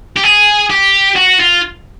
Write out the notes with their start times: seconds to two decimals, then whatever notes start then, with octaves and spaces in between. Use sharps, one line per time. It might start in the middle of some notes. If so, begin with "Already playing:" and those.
0.17 G4
0.24 G#4
0.70 G4
1.16 F#4
1.40 F4